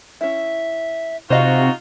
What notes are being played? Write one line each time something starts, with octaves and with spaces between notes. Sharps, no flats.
C#4 E4 E5
C3 D#4 F4 F#4 C5 D#5 F5